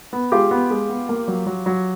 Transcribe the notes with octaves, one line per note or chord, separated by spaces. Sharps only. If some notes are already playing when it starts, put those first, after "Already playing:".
B3
G#3 F4 G4
B3
G#3
B3
A#3
F#3
F#3
F#3